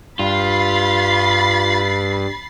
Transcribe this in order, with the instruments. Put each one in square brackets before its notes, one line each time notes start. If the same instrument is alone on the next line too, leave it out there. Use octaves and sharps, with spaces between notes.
[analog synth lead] G2 [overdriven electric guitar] F4 [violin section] B5 A6 C7